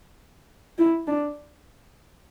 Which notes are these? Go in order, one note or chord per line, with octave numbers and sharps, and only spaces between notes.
E4
D4